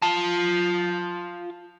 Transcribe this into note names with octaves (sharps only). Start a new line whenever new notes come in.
F4 A5